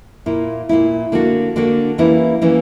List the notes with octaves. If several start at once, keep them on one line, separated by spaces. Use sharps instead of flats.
A#2 A#3 E4
A#2 A#3 E4
D3 A#3 D4 F#4
D3 A#3 D4 F#4
E3 G3 A#3 C#4 E4
E3 G3 A#3 C#4 E4